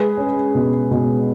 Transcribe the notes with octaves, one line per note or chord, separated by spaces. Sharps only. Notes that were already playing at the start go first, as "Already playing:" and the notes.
Already playing: G#3 G#4 B4
C#4
B2
B2